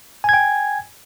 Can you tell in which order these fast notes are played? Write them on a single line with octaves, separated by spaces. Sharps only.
G#5 G#6 G5